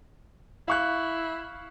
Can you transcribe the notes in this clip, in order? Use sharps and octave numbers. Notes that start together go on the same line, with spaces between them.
E4 F5 C#6 F#6